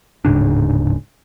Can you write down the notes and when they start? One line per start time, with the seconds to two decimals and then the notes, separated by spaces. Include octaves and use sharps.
0.25 D1 G#2 C#3 D4